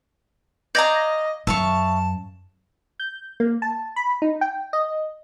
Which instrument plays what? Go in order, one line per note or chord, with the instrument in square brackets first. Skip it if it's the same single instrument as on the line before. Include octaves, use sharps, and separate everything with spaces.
[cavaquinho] D5 F5 A#5 [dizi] D#5 [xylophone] G6 G#6 A#6
[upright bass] F#2 [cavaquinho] E5 F5 C#6 [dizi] A5
[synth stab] G6
A#3
A5
B5
D#4
G5
D#5